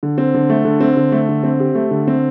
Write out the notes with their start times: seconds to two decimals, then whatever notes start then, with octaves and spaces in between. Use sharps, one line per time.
0.03 D3
0.18 C4
0.34 D3
0.50 A3
0.65 D3
0.80 C4
0.97 D3
1.12 A3
1.29 D3
1.43 C4
1.60 G4
1.75 A3
1.91 D3
2.07 C4